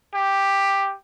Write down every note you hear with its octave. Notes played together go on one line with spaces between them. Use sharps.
G4